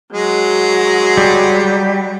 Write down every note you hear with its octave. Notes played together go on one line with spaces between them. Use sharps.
F#3 G#3
G3